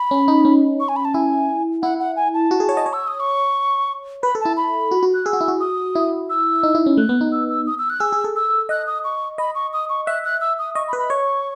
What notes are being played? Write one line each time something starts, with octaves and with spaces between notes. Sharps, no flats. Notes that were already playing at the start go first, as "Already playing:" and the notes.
Already playing: B5
C#4
D#4
C#4
C#6
G#5
B5
A5
E4 G#5
E4 F#5
F#5
G#5
A5
F#4
G#4
C#5
D#5
C#5
E6
D#6
C#6
B4 B5
A4
E4 A5
B5
F#4
F#4
F#6
G#4 E6
F#4
E4
F#4
D#6
E4
E6
D#4
E4
C#4
A3 F#6
B3
D#4
E6
E6
D#6
E6
F#6
G#4 E6
G#4
A4
E6
D#5 F#6
D#6
C#6
D#5 B5
C#6
D#6
C#6
E5 F#6
F#6
E6
D#6
D#5 C#6
B5
B4
B5
C#5 C#6